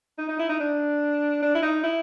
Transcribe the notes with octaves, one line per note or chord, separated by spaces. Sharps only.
D#4
D#4
E4
D#4
D4
D4
E4
D#4
E4